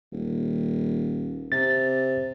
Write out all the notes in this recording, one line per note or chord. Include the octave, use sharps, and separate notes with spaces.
D#1
C3 A6